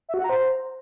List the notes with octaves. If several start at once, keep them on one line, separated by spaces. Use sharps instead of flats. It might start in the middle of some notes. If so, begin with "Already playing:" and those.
E5
F#4
F#5
A#5
C5